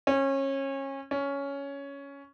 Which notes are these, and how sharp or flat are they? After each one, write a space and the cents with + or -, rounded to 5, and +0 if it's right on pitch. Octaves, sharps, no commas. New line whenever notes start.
C#4 -25
C#4 +10